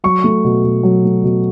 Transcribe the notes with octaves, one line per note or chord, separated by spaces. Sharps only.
F#3 C#6
A3
B2
B2
F#3
A3
B2